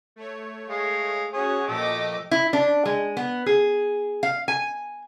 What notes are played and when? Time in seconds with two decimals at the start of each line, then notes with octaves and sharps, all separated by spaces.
0.16 A3 C#5
0.69 G#3 F5
1.33 C#4 F#4 G#4 C#5
1.68 A#2 F3 A3 G4 D#5 D6
2.31 E4
2.53 D4
2.85 G#3
3.17 B3
3.46 G#4
4.23 F5
4.48 G#5